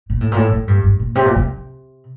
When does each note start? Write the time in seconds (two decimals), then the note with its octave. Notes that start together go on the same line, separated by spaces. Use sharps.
0.10 A#2
0.21 A2
0.32 A#2
0.36 A2
0.52 A2
0.68 G2
0.83 G2
0.99 A#2
1.15 C3
1.26 A#2
1.36 C3